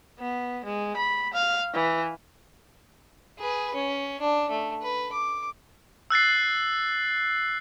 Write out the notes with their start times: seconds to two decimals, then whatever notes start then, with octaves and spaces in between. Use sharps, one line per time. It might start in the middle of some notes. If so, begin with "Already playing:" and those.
0.20 B3
0.65 G#3
0.96 B5
1.34 F5
1.74 E3
3.39 G#4 B4
3.74 C#4
4.21 D4
4.50 A3
4.82 B4
5.12 D6
6.10 E6 F#6 A6 C7